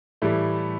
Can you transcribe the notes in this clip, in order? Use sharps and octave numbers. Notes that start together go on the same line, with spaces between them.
A2 E3 G3 A3